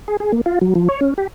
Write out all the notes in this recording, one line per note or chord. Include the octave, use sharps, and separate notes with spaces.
G#4
G#4
A#3
F4
F#3
F3
C#5
C#4
G4